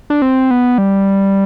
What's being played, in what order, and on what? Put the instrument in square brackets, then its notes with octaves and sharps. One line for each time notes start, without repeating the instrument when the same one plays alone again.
[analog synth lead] D4
C4
B3
G3